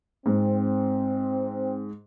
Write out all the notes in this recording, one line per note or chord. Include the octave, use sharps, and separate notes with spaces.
G#2 C4